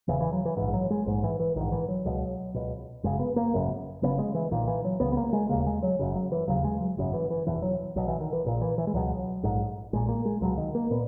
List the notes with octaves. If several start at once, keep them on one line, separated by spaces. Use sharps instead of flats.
E1 E2 C#3 E3
E3
F#3
E3
A#1 G#2 E3
F#3
G#3
A#1 G#2 G#3
E3
E3
A#1 G#2 D#3
E3
F#3
C#2 B2
C#2 B2
F#1 F#2 C#3 G#3
B3
A#3
G#1 F#2 C#3
F#1 F#2 C#3 B3
G#3
E3
B1 A#2 D#3
E3
F#3
C#2 C#3 B3
B3
A#3
G#3
E1 D#2 C#3 A#3
G#3
F#3
F#1 F#2 C#3
F#3
E3
E1 D#2 C#3 F#3
G#3
F#3
G#1 F#2 C#3
E3
E3
F#1 E2 B2 E3
F#3
B1 B2 F#3
E3
D#3
E3
A#1 A#2
E3
E3
G#3
C#2 B2 F#3
A#1 G#2
A#1 A#2 G#3
A#3
G#3
C#2 B2 F#3
D#3
A#3
A#2 B3